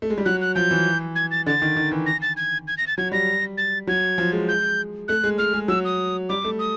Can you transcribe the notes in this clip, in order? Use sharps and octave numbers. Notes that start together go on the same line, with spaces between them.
A3
G#3
G3
F#3 F#6
F#6
F3 G6
E3
G#6
A6
D3 A6
D#3
D#3
E3
A#6
A6
G#6
G#6
A#6
A6
F#3 G#6
G3 A#6
A6
F#3 G#6
F3
G#3
G6
A3 F#6
G#3
G#3 F6
G#3
F#3 E6
D#6
G3 D6
A3
D#6